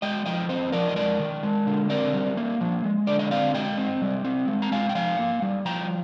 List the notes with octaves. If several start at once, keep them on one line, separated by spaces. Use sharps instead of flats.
G#3 D#5 G5
F3 D#5 G5
C4 C5 D#5
F3 A#4 D5
D#5
G#3 A#4 D5
D#3
G#3
D3
C4 A#4 D5
G3
A#3
F3
G#3
D3 D5
D#5
C4 D5 F5
G#3 D#5 G5
C4
G3
C4
G#3
A#5
G#3 F5 G#5
G5
F3 F5 G#5
A#3
G3
F3 G5 A#5